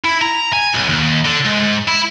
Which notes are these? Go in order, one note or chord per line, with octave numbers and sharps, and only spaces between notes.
E4
A#5
G#5
B1
D#2
D3
G#2
E4